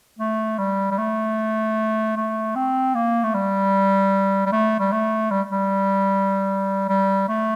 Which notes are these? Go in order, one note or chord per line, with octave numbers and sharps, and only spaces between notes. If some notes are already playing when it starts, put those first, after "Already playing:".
A3
G3
G3
A3
A3
C4
A#3
A3
G3
G3
A3
G3
A3
G3
G3
G3
A3